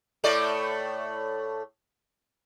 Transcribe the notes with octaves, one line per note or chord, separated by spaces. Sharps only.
A2 A3 D5